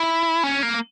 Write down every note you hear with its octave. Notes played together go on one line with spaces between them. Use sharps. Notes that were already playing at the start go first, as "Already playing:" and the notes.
Already playing: E4
C#4
A#3